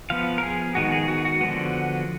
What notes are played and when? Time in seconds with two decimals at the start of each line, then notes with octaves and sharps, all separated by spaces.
0.10 F3 B3 F5
0.38 A#4
0.43 G#4
0.75 D#3 G#3 B3 F#4
0.92 G#4
1.08 F#4
1.25 F#4
1.41 D3 F3 B3